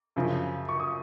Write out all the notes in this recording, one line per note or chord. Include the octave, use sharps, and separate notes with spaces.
F#2 C#3 F3
C#6
D#6